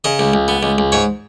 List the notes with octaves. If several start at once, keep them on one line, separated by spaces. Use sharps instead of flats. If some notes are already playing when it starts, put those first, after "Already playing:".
C#3 D#5
C#2
C#2
B3
C#2
C#2
G#2 C#5